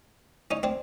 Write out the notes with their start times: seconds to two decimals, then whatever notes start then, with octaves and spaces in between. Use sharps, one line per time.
0.51 C#4 D#4
0.63 C4 D4